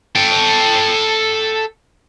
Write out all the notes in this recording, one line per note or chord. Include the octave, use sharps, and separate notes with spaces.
A4 G5